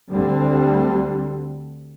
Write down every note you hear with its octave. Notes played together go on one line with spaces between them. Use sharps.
D2 D3 G3 C4